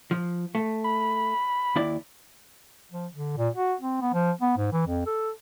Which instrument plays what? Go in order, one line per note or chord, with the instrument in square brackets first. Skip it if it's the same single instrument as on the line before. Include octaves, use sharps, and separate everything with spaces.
[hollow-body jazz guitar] F3
A3
[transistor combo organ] B5
[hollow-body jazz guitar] D#2 E4 D5
[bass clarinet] F3
D3
A#2
F#4
C4
B3
F3
B3
G#2
E3
F2
A4